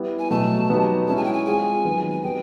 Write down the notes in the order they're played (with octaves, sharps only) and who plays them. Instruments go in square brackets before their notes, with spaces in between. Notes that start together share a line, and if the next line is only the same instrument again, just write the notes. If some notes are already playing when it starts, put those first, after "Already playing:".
Already playing: [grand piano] G3 B3 E4
[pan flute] G#5
[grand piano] B2 F#3 A3 [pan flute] A5
[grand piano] F#3 B3 D#4 G4
[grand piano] G#3 C#4 E4 G#4 [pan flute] A5
[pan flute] G#5
G5
G#5
[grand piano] G#3 C4 F4 G#4 [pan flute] G#5
[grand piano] D#3 F#3 B3
[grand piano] G3 B3 D#4 [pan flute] G5